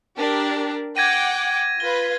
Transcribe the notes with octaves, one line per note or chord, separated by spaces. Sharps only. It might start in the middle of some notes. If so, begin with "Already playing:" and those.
D4 G4 A#4
F#5 G5 D6 G#6 A#6 D#7
F4 B4 G7